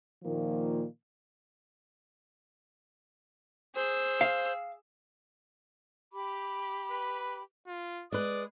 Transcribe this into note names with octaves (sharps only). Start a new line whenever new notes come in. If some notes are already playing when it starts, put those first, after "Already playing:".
A#2 D#3 F3 A#3
G#4 C5 E6
F5
G4 B5 D6
B4
F4
G#3 B4 D5 D#6